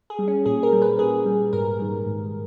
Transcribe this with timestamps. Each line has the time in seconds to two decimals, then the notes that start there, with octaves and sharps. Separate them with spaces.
0.10 G#4
0.19 G3
0.28 C#4
0.46 A#2 G#4
0.63 A#4
0.72 G3
0.82 B4
0.99 A#2 G#4
1.26 G3
1.53 G#2 A#4
1.79 D#3 G3
2.06 G#2